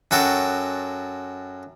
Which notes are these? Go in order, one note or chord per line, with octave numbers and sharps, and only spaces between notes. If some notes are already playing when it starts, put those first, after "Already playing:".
F#2 F#4 A4 G5